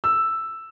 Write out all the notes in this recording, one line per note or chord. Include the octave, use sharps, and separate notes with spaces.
E6